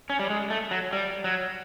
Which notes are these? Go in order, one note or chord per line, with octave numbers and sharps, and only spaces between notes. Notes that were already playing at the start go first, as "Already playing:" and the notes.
C#4
G3
G#3
A3
F#3
G3
F#3